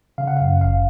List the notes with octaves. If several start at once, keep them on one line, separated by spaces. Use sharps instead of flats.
C#3 F5
F#5
F#2 F5
G1 F5